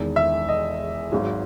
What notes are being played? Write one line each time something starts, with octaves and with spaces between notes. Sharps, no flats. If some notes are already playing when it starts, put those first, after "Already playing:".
Already playing: E1 E2 D#3
E5
D#5
G#1 G#2 F#3